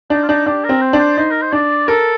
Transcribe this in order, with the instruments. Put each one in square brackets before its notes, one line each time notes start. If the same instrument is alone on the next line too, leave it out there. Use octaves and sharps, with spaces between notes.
[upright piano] D4 [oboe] D#4
[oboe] F4
[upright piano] D4 [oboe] D#4
[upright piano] D4 [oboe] G4
[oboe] A#4
[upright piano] C4
[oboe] C5
[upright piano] D4
[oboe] C5
[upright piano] D#4 [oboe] C5
[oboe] A#4
C5
[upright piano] D4 [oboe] D5
[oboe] A4 [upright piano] A#4